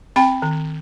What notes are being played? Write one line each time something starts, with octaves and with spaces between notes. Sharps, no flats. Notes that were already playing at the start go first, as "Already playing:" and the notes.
C4 G5 B5
D#3